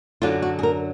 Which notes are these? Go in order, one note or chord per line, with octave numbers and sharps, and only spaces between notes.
F#2 D3 F#3 D4 F4
F#4
G#4
A#4